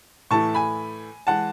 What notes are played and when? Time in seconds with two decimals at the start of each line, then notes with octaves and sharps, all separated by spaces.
0.31 A2 E3 A3 E4 A5 C#6
0.55 G#5 B5
1.27 E3 G#3 F#5 A5